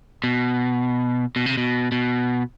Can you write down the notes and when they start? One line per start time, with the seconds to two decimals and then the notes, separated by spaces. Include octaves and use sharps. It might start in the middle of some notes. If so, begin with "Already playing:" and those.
0.24 B2
1.36 B2
1.46 C3
1.57 B2
1.92 B2